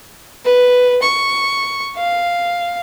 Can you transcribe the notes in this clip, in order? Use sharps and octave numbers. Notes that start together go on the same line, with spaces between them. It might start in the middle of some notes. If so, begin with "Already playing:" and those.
B4
C#6
F5